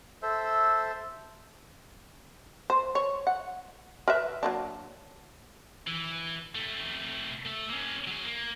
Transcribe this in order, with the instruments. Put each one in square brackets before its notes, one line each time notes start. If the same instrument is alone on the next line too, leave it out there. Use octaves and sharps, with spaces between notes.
[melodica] A4 C5 E5
[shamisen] C5
C#5
F#5
A#4 B4 E5
F#3 A#3 D4
[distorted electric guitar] E3
C3 A3
A3 E5
A#3 C#4
F#3 G#4
A#3